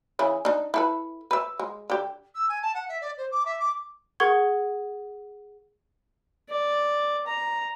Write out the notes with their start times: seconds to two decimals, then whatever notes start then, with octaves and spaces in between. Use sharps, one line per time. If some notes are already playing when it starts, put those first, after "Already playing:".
0.19 C#3 E3 G#4
0.45 D4 D#4
0.74 E4 A4 B4
1.31 B4 E5
1.59 G#3
1.90 D3 G4
2.35 E6
2.49 G#5
2.62 A5
2.74 F#5
2.88 E5
3.01 D5
3.17 C5
3.31 D6
3.45 E5
3.59 D6
4.20 G#4 A#4 F#5 C#6 G#6 G7
6.50 D5
7.27 A#5